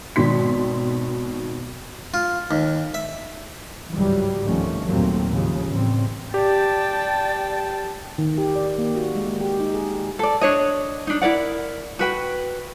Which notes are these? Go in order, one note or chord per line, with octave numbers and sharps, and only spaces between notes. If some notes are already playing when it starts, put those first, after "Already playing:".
G#1 B2 D#3 C6 B6
F4
D#2
E5
G1 C#2 G#2 E3 F#3 G3
G1 C2 D#3 F3 A3 C#4
D#2 A#2 F#3 A3 A#3 C4
D#2 G#2 C#3 F3
E2 A2 G3 C4
G4 D5 G5 A5
D#3
G4
D5
A#3
F#4
G#3
G#3
G4
D#4
G#4
A4 D5
D4 C#5 D#5
D4 D#4
E4 A#4 D5 F#5
F#4 B4 G5